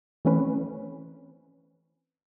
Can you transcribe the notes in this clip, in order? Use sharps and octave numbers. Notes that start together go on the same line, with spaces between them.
E3 A3 C4 C#4 B4